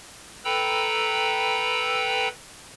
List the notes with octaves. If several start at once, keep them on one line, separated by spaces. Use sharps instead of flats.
A4 B4 G5 A#5 B5 E6